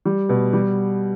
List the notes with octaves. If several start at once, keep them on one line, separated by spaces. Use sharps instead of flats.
G3
B2
G3